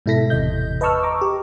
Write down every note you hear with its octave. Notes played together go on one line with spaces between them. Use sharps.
G#2 B2 E4 A4 A#6 B6
G1 E2 C3 D#5 G6
B4 D#5 A5 C#6 E6 F6
A#5 C#6 D6
G4